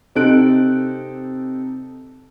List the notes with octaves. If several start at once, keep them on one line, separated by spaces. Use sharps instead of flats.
C3 C4 D#4 A4 F#6 D7